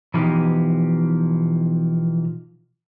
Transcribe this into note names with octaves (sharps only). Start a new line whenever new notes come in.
B2 E3 F3 B3 D#4 G4